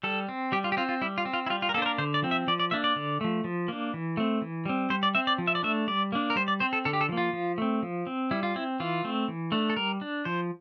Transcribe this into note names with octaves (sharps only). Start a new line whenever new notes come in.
G3 A4
C4
G3 G4
F4
G4
C4 F4
F4
G3 E4
F4
C4
F4
E4
G3 F4
F4
A#4
A#3 D4 A4 C5
A#4
D3 C5
D5
F3 C4
E5
F3 D5
D5
A#3 D4 E5
D5
D3
F3 A3
F3
A#3 D4
E3
A3 C4
E3
G3 C4
G3 C5
D5
C4 E5
D5
F3
E5
D5
A3 D4 E5
G3 D5
A#3 D4
A#4
G3 C5
D5
C4 C5
A4
D3 A4
G4
A4
F3 A#3
F4
F3
A3 C4
F3
C4
G3 E4
F4
C4 E4
E3 F4
A3 C4
E3
A3 D4
A4
G3 A#4
D4
F3 C5